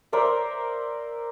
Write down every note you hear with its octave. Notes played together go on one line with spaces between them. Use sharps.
A#4 C5 D5 E5